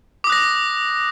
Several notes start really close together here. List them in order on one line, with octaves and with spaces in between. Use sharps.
D6 D#6 F#6 A#6